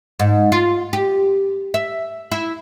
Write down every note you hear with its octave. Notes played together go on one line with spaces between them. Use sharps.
G#2
F4
G4
E5
E4